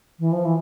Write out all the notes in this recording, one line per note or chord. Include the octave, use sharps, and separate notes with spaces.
E3
F3
E3